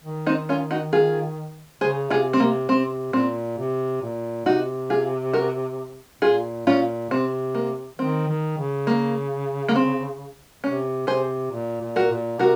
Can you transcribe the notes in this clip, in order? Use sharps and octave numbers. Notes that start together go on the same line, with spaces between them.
D#3
C4 D#4
C#4 F4
D#4 F#4
F4 G#4
C#3 G#4 C5
C3 F4 G#4
C4
C3 A#3
C3 C4
A#2 C4
C3
A#2
C3 D#4 F#4
F4 G#4
F#4 A#4
A#2 F4 G#4
A#2 C#4 F4
C3 C4
A#3
D#3 C4
D#3
C#3
A#3
A#3
C4
C3 C#4
C3 G#4 C5
A#2
A#2
F#4 A#4
A#2
C3 F#4 A#4